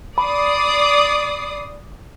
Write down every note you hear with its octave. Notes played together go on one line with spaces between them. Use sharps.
D5 B5 D#6 C7